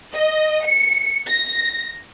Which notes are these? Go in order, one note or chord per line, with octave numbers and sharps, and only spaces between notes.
D#5
C#7
A#6